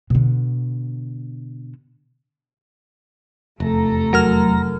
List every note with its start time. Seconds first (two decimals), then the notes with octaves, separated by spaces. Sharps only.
0.10 B2 D3
3.60 F1 E2 A3 A4 A#5
4.13 F#3 A#4 F6